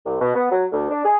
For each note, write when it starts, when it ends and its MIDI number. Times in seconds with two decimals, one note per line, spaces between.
0.06 0.16 36
0.21 0.34 47
0.35 0.48 59
0.51 0.66 54
0.72 0.86 38
0.90 1.01 62
1.05 1.17 68